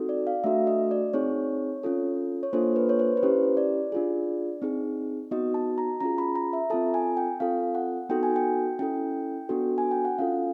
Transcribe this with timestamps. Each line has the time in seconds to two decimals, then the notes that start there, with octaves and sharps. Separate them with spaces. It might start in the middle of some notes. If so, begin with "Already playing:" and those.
Already playing: C4 D#4 F#4 A4
0.09 D5
0.27 F5
0.44 A3 D4 F#4 A4 E5
0.67 D#5
0.91 D5
1.13 C4 D#4 G#4 C#5
1.83 C#4 F4 A4
2.43 C#5
2.53 A#3 D4 F4 A4 C5
2.76 B4
2.89 C#5
2.99 C5
3.17 B4
3.23 C#4 E4 G4 C5
3.57 D5
3.92 D4 F4 G#4
4.62 C4 D#4 G#4
5.31 B3 D#4 F#4 D#5
5.54 A5
5.78 A#5
6.00 C#4 F4 G#4 A#5
6.18 B5
6.35 A#5
6.53 E5
6.70 C4 F4 A4 A5
6.94 G#5
7.17 G5
7.40 C4 F4 A4 F5
7.75 F#5
8.09 B3 D#4 F#4 A4 G5
8.23 G#5
8.36 G5
8.79 C#4 E4 A4 G5
9.49 B3 D4 F#4 A4
9.78 G#5
9.91 G5
10.05 F#5
10.18 C#4 F4 A4 F5